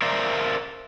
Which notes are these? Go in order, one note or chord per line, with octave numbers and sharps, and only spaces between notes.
A#4 C5 D5 E5 F5